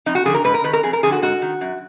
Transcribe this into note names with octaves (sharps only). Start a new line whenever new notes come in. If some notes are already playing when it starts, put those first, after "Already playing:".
F2 D#4
F#4
D3 F3 G#4
A#4
G#2 B4
A#4
D#3 B4
A#4
F2 G#4
A#4
D3 F3 G#4
F#4
G#2 F#4
D#3
F#2